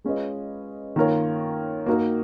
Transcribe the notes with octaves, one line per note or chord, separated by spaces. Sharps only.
G#3 C#4 F4 B4 D#5
D#3 A#3 F4 A#4 C#5
A#3 D#4 F#4 A#4